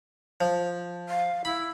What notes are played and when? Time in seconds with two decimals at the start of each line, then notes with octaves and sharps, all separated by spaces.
0.41 F3
1.09 F5
1.45 E4 B5